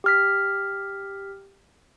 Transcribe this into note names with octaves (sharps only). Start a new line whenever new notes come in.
G4 F6 B6